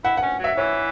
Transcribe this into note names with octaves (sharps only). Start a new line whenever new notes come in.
E4 F#5
C#4 F#5
F#3 E5
E3 C#5